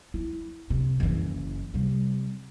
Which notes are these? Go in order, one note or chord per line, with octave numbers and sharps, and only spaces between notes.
E4
C3
F#1 E3
C3 G3